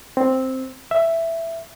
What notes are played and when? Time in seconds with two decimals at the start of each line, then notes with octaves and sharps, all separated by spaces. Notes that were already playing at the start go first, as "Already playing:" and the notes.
0.17 C4
0.91 E5